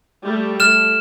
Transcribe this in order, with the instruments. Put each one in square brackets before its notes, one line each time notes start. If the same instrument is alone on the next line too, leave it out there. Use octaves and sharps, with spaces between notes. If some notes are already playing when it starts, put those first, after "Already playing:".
[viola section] G3 A3
[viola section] A3 [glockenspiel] F6 E7